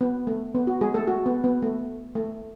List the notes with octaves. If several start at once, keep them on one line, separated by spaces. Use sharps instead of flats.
B3
A3
B3
F#4
G#3 G#4
A3 A4
F#4
B3
B3
A3
A3